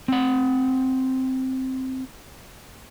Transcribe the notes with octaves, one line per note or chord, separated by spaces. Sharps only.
C4 F#5